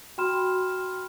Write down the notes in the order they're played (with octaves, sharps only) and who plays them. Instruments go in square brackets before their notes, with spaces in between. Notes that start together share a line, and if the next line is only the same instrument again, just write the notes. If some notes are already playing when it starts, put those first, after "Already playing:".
[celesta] F#4 G5 B5 C6 F6 E7